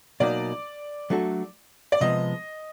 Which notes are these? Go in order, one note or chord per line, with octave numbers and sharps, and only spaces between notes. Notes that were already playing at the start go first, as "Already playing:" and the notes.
B2 F#3 A#3 D#4 D5
F#3 A3 D4 F#4 A4
D5
C3 F3 G#3 B3 D#5